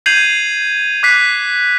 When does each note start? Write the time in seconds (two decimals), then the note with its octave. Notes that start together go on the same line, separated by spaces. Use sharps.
0.06 G6 G#6 C7 D#7 F7 F#7
1.03 D6 F#6 B6 C7